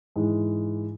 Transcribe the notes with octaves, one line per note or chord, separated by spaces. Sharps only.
G#2 E3 G#3